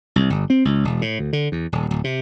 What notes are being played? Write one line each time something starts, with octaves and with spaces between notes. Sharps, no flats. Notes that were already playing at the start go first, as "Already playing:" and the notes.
C2
G1
C4
C#2
E1
A2
D2
D3
E2
D#1
D1
C3